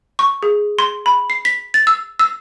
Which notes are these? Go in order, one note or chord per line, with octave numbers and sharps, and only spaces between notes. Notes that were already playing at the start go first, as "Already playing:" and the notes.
C#6
G#4
C6
B5
C7
B6
A6
E6
E6